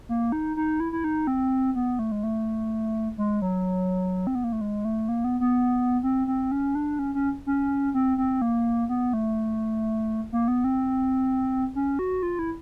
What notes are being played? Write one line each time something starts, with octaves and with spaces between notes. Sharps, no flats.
A#3
D#4
D#4
E4
E4
D#4
C4
B3
A3
G#3
A3
G#3
F#3
C4
B3
A#3
A3
G#3
A3
A#3
B3
B3
C4
C4
C#4
D4
C#4
C#4
C#4
C4
C4
A#3
B3
A3
A#3
B3
C4
C#4
F#4
F4
E4